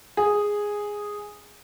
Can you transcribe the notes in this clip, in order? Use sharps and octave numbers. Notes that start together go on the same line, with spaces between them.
G#4